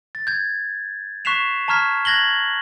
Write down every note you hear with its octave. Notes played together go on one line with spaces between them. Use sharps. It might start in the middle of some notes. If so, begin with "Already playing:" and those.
A6
G6 G#6
C#6 F#6 B6 C7 E7 F7
A5 A#5 C#6 F6 G#6 B6
F#6 G#6 A#6 F#7 G7